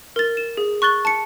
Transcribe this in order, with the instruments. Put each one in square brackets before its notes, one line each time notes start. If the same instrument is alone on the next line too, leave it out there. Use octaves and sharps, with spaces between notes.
[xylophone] A#4 A6
E7
G#4
C#6 F#6 A6 G7
A5 C#7